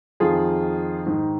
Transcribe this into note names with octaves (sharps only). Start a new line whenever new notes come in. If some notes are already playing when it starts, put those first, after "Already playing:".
F2 D#3 F4 G#4
G#2 D#3